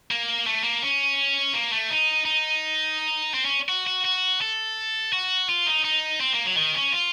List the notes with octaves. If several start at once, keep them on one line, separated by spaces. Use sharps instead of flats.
A#3
A3
A#3
C#4
A#3
A3
D#4
D#4
C4
C#4
F#4
F#4
F#4
A4
F#4
F4
D#4
D#4
C4
A#3
F#3
D#3
C#4
F4